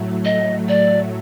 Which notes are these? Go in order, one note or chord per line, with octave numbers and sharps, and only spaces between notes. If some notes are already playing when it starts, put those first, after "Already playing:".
Already playing: A2 F#3 A3
D#5
D5